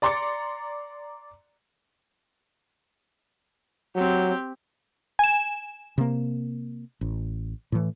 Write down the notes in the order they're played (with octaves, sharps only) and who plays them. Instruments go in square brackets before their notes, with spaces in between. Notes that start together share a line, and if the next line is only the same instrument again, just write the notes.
[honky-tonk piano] D5 A#5 C6 D6 A6 C#7
[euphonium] F#3 [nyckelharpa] C4 G4
[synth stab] G#5 E7
[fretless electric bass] C3 A#3
A1
A2 E3